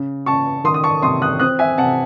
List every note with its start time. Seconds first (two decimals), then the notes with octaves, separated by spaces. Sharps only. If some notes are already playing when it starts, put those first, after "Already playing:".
Already playing: C#3
0.26 C#3 A5 C#6
0.64 D#3 C6 D#6
0.74 D#6
0.83 A5 C#6
1.02 C3 C6 D#6
1.22 D#6 F#6
1.40 C4 D#6 F#6
1.59 E5 G#5
1.78 C3 F#5 A5